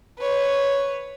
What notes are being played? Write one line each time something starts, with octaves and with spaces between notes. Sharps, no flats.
B4 C#5